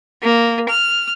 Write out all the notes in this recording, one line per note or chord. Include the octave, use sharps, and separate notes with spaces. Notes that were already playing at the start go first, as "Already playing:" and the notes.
A#3
F6